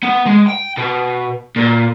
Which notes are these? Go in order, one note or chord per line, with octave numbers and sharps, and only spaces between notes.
B3
G#3
G5
B2
A#2